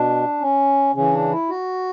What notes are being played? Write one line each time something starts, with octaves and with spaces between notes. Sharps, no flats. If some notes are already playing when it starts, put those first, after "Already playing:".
Already playing: B2 D4
C#4
C#3 E3 C#4
D4
E4
F#4